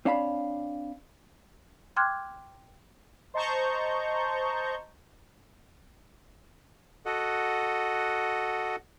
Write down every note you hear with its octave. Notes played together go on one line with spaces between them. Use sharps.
C4 D4 C#5 F5 A5 B5
G5 C6 D6 F6 F#6 G#6
C5 D#5 A5 A#5 C#6 G6
F#4 A4 D#5 F#5